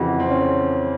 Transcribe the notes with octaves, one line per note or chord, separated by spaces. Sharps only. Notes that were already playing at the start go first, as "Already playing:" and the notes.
Already playing: F2 C#3 E3 F#4
C4
C#4